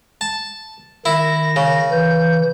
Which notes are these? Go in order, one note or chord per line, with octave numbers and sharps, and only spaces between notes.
A5
D#3 E4 A#6
C#3
E3 G6